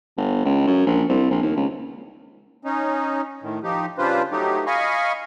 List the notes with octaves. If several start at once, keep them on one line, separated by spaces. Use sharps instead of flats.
G1
C#2
F#2
A#1
C2
A#1
D#2
C#2
C#4 D#4
A2 D#3
F3 D#4 G4
C#3 G3 D4 F4 B4 C5
F#3 A3 D#4 G4
D#5 F5 G#5 B5 C#6